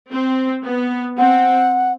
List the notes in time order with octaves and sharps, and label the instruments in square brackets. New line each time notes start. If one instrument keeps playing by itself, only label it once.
[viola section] C4
B3
[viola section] C4 [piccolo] F#5